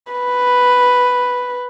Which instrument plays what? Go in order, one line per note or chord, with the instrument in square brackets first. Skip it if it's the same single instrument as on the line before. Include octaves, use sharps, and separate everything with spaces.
[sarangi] B4